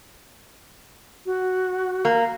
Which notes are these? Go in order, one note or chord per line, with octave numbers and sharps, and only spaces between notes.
F#4
A#3